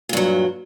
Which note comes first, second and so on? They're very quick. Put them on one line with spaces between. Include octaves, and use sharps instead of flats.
A#2 G2 F#3